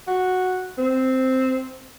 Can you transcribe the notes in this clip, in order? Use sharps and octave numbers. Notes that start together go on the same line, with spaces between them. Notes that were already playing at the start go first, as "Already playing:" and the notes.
F#4
C4